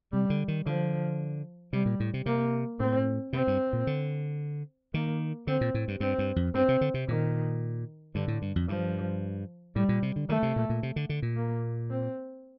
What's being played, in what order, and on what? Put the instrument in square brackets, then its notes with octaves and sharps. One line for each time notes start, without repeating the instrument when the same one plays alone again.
[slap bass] C3 [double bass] G3
[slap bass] D3
D#3
[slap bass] D3 [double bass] F3
[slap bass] C3 [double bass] G3
[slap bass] A#2
A2
C3
[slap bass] C3 [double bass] A#3
[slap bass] A2 [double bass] C4
[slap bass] C3 [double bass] C4
[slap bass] G2
A#2
D3
[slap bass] D#3 [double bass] A#3
[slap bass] D3 [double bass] C4
[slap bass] A#2
A2
G2
[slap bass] G2 [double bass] C4
[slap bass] G2
F2
[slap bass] G2 [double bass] C4
[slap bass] C3
D3
C3
[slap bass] A#2 [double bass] D#3
[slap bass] G2 [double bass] D3
[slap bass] A2
G2
F2
[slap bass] G2 [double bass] F3
[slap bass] A2 [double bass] G3
[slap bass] A#2
C3
D3
[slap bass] D#3 [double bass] A3
[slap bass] C3
A#2
A#2
C3
D3
D3
A#2
[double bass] A#3
C4